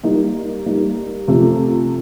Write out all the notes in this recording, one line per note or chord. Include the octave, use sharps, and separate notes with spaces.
G3 A#3 D#4
G3 A#3 D#4
C3 F3 A3